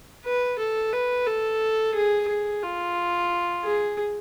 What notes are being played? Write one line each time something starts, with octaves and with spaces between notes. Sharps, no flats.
B4
A4
B4
A4
G#4
G#4
F4
G#4